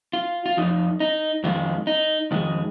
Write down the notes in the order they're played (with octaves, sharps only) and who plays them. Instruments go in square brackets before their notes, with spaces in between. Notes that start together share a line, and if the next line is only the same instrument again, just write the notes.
[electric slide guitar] F4
F4
F2 F3 D#4
D#4
F2 D#3 G#3 F4
D#4
F2 D#3 G#3